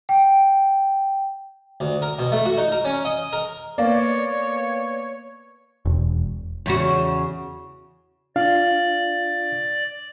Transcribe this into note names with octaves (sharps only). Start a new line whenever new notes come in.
G5
D2
A#4
B2
A3
F#4
D#4
A#4
C#4
D#5
A#4
A#3 B3 B4 C#5 D5 F5
E1
E2 C#3 F#4
D4 F4 D5 F5